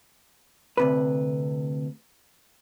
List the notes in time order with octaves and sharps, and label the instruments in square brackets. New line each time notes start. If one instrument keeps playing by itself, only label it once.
[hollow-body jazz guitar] D2 C3 B4